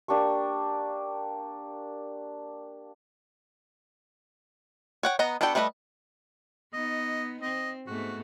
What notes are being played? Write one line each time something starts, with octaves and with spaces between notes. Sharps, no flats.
A#3 D4 G4 C#6
C#5 F#5 G5
B3 D#5 F#5 A#5
B3 D4 F#4 A4 G5
G3 A3 D4 B4 D#5
B3 D#4 D#5
C4 D#5
G#2 A3 B3 F#4